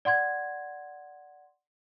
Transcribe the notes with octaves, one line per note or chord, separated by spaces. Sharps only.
D5 F#5 C6 G#6